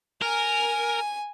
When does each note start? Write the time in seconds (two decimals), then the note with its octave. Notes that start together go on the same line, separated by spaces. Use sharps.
0.22 A#4 G#5